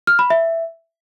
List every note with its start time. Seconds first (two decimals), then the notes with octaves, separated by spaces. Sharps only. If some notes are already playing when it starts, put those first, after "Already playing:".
0.07 F6
0.19 B5
0.30 E5